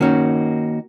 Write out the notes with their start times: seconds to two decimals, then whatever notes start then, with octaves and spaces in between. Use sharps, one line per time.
0.01 D#3 A#3 C#4 D#4 F#4